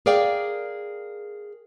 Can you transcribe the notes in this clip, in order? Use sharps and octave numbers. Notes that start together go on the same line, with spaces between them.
G#4 A#4 D5 F5 G5